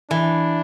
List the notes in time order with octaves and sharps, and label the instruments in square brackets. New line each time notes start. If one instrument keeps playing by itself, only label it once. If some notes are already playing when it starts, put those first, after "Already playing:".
[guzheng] E3 [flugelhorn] D4